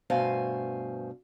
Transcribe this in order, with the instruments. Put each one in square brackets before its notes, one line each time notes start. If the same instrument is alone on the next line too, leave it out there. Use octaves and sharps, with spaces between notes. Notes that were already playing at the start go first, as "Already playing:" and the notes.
[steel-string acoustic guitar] G2 B2 A3 C5 F5 G#5